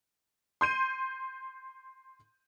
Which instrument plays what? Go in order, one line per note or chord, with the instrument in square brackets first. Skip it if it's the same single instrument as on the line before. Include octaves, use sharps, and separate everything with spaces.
[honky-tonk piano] C6 G6 D#7